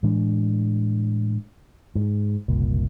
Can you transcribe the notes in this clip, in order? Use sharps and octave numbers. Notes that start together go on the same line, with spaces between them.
A2 E3 G#3 D4
G#2
F#1 C2 A#2